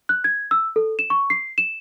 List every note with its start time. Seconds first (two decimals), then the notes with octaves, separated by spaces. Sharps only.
0.09 F#6
0.24 G#6
0.51 E6
0.76 A4
0.99 E7
1.10 C#6
1.30 C7
1.58 E7